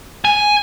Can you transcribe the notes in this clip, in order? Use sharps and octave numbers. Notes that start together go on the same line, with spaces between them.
G#5